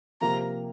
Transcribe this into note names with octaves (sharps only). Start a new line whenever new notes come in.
C3 F3 A#3 A#5